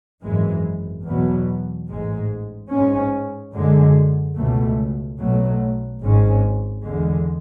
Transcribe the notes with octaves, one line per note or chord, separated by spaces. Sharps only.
G#1 F#2 E3 G#3
E2 B2 F#3 B3
A1 G#2 G#3
G#2 G#3 C#4
F#2 D3 G#3
C#2 B2 A3
B1 B2 F#3 A3
G#1 G#2 G#3 C#4
E2 D3 G#3